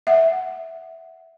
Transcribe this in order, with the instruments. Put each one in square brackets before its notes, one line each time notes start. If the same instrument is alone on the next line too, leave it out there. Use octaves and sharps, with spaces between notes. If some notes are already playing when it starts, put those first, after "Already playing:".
[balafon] E5 F#5